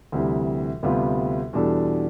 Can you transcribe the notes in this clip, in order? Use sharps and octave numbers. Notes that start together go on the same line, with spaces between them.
D2 C3 E3 G3
D2 C3 G3 B3 F4
E2 B2 G3 D4 A4